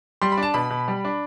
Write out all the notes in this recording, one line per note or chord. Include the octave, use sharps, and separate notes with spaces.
G3 C6
B5
D4
A5
B2 B5
B2
G3
D4